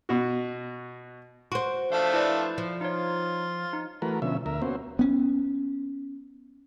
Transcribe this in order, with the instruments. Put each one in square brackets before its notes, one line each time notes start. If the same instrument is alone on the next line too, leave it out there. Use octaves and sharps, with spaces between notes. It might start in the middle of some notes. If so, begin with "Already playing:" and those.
[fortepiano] B2 F#4
[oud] F#4 C5 [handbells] C6 C#6 D7
[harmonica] F3 A3 D4 [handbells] E5 F5
[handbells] E4 B4 D5
[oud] F3
[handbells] D#4 C#5 [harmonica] F4
[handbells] D#4
[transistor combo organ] E3 A3 F#4 A#4 B4
B2 D3 F3 C#4 E5
D2 A#4 E5
A#3 B3 C#4 F#4 C5
[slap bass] B3 C#4